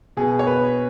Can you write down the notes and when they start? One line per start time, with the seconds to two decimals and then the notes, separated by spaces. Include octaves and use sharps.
0.17 B2 B3 G#4
0.39 C#5
0.47 B4